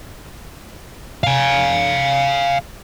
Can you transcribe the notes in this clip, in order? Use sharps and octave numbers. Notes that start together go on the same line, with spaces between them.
F5 G#5